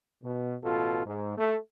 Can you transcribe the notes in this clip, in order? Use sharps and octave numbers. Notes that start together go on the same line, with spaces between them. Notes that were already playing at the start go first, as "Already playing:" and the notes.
B2
A1 B2 F4 A4
G#2
A3